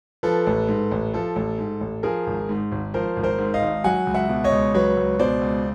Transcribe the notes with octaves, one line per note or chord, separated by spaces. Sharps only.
F3 A4 B4
A1
G#2
A1
F3 A4
A1
G#2
A1
F3 G#4 A#4
G#1
G#2
G#1
F3 A#4 C5
G#1
A#4 C5
G#2
D#5 F5
G#1
F#3 F#5 G#5
C#2
E5 F#5
B2
C#5 D#5
C#2
F#3 B4 C#5
C#2
B2 C5 D5
C#2